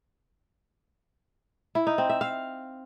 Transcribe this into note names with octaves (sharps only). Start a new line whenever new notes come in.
E4
D#4
C4
E5
F5